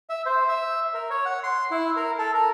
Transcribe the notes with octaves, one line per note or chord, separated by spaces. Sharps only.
E5
C5
E5
A#4
C#5
F#5
C6
E4
A#4
A4
A#4